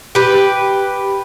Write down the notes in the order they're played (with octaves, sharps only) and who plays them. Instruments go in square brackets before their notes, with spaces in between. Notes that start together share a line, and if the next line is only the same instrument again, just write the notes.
[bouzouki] G4 B4